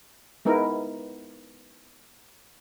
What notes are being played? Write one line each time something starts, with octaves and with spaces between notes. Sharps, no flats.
G#3 B3 D#4 E4 A#4